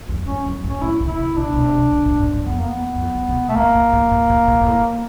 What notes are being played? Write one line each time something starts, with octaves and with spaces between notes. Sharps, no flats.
F2
G2 C#4
F#2
G#2
C#4
A2 E4
C#3
E4
C3
B2 D4
B2
C3
B2
A#2
A2
G#2
G2
F2 B3
A#3
B3
F#2
F2
F#2
B2
A3
A2 A#3
A2
G#2
G#2
A2
A#2
G#2
A2